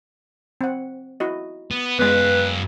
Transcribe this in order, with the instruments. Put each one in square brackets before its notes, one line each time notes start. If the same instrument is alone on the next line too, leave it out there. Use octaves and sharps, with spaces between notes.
[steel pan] C4 F#5
E4 F#4 D#5
[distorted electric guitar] B3
[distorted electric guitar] F#2 F5 [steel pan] G#3 B3 [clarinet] B4